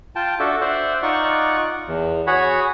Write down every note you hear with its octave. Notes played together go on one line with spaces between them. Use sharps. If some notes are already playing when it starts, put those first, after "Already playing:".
F4 G5 A5
D4 F#4 A4 E5
C5 D5 E5 F#5
D#4 F4 D5 F#5 C#6
E2
F#4 G#4 C#5 F#5 B5